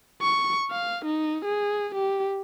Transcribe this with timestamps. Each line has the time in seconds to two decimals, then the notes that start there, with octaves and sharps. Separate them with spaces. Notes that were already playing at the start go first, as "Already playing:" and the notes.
0.22 C#6
0.71 F5
1.05 D#4
1.45 G#4
1.95 G4